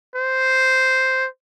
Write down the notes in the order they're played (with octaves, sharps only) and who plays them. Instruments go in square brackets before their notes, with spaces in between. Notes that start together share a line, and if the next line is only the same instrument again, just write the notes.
[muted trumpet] C5